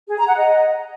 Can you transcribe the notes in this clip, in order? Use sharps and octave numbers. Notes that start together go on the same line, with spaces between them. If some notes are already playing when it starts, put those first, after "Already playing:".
G#4
A#5
F#5
D#5